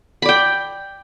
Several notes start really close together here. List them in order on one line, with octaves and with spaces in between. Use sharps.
B5 D5 G5